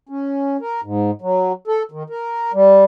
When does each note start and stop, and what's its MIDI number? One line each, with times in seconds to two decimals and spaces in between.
0.09 0.57 61
0.61 0.81 70
0.84 1.11 44
1.22 1.52 54
1.68 1.83 69
1.92 2.03 51
2.10 2.52 70
2.54 2.84 55